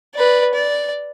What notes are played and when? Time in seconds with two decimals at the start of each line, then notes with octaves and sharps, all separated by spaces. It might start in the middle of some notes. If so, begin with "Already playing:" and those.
0.15 B4 D5
0.54 D5